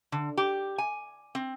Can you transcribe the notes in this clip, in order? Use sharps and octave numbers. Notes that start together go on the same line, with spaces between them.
D3
G4
G#5
C4